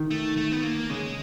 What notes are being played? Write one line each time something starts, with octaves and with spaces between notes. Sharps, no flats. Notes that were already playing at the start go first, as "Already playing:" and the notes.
Already playing: D#3
A3
A3
B3
A#3
C#3 G#3